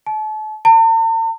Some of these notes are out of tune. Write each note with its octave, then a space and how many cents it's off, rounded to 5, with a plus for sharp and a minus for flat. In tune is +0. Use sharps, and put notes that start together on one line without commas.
A5 -35
A5 +45